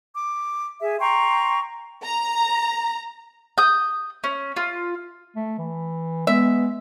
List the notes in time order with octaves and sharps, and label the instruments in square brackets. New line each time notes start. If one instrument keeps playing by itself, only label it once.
[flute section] D6
G#4 E5
G5 A#5 C6 C#6
[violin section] A#5
[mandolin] D#6 G6
C#4
F4
[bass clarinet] A3
E3
[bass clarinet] G#3 [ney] B3 [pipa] E5